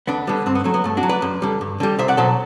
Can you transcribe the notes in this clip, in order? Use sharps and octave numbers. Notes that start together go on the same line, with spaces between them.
D2 B3 D4
D3 G3 B3
G2 C4
B3
F#3 A3
B3
G2 A3
D4 F#4
F#3
B4 D5
F#2
D3 G3
G2
D3 G3
C2 C5 E5
D5 F#5
B2 F#3 A4 C5